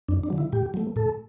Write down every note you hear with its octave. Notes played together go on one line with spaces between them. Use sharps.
F#2 D4
D4
D3 F#3
E4
A2 G4
F#3 A3
A2 A4